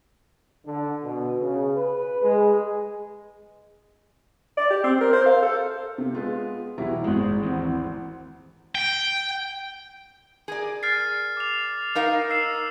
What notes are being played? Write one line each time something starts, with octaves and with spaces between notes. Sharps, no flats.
D3
B2
C#3
B4
G#3
D5
G4
C4
A#4
C5
F5
A4
C3
G#3 B3 F4
B1 E2 E3 F#3 G3 E4
G#1 G#3 F#5
D#2 E3 C4
G5
G#4 A#4 D5
F6 A6 C7
D6 F7
D#4 A#4 F5
E6 C7 E7